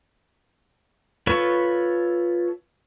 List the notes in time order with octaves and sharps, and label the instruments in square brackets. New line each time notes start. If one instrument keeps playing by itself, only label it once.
[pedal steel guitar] F4 A4 B4 C#5 C#6